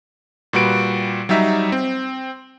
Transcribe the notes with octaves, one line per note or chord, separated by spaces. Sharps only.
A#2 G3 F#4 B4 D7
F#3 G3 D#4 E5
C4